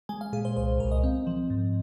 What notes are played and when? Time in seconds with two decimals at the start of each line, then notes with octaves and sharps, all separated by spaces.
0.09 G#3 G#5
0.21 F5
0.33 A#2 G#4
0.45 C5
0.57 C2 C5
0.80 C2 A#4
0.92 D#5
1.04 C4
1.27 F3
1.50 G#2